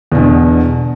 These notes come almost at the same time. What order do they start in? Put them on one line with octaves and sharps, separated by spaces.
E2 B2 D3